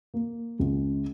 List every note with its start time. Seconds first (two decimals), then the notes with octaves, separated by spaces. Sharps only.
0.14 A#3
0.59 C#2